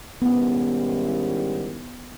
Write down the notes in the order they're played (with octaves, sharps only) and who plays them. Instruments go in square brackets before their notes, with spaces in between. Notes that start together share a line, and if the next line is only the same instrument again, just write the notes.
[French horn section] G#2 D#3 G3 C#4 E4 [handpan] B3